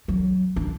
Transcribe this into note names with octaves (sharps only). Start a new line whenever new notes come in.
F#3
D4